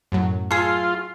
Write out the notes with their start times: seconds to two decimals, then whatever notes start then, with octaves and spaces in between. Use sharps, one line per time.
0.12 F#2 A2 F#3
0.51 F4 G#4 A4